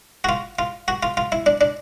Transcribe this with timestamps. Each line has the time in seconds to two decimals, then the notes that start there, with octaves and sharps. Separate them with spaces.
0.24 F#4
0.29 F4
0.59 F4
0.88 F#4
1.03 F4
1.17 F4
1.32 E4
1.46 D4
1.61 D4